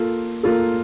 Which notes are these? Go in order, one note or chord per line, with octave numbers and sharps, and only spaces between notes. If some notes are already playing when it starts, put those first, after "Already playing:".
Already playing: A#3 F4 A4
A#3 F4 A4